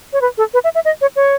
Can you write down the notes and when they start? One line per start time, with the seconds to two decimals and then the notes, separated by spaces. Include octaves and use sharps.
0.13 C#5
0.21 B4
0.38 A4
0.54 B4
0.64 E5
0.75 E5
0.85 D#5
1.01 C#5
1.16 C#5